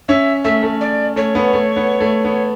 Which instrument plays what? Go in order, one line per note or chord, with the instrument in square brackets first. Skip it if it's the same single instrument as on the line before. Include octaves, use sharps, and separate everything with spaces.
[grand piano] C#4 [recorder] E5
[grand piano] A3 [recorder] E5
[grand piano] A3
[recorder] D5
[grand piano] A3 [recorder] C#5
[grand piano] B3
A3
B3
A3
B3